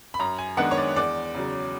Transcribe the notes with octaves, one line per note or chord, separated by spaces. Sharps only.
B5
F#2 A#5
G#5
D#3 G#3 B3 D4 F#5
C#5
D5
E2 D5
C#3 F#3